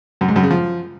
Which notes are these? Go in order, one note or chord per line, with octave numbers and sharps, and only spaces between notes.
F#2
G#2
F#2
C#3
F3